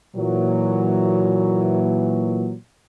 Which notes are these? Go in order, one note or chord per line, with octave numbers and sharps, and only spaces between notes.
A#2 E3 F#3